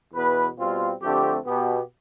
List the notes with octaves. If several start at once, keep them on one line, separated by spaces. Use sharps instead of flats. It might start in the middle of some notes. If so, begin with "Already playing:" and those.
E2 B2 B3 B4
B2 G3 C4 F4
F2 D3 A3 C4 G4
B2 B3 G4